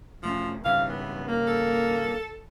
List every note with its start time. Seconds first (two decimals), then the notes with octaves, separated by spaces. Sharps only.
0.23 E1 F3 A3 C#4
0.65 G#1 C#3 E3 G3 F5
0.89 B3
1.28 A#3
1.47 A4